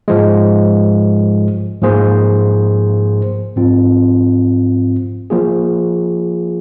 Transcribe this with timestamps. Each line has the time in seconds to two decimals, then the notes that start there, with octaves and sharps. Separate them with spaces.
0.08 G#2 F3 G#3
1.82 G#2 F3 A#3 G#4 C5
3.56 G#2 F3 C4 F4
5.30 F3 A#3 F4 G#4